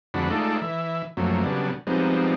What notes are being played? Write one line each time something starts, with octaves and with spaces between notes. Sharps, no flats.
F2 D3 G#3 D4 F#4 B5
G#3 A3 D#4 F4 A4 D5
E3 E5
F#2 F3 F#3 A3 A#3
C#3 F#3 G3 B3 D4
F3 G3 G#3 B3 C4 D#4